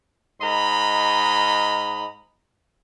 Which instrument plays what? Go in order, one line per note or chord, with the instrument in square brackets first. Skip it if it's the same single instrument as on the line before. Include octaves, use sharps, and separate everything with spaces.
[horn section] G#2 D#5 A#5 B5